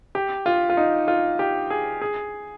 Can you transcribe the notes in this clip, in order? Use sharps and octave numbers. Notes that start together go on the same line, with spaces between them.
G4
F4
F4
D#4
F4
G4
G#4
G#4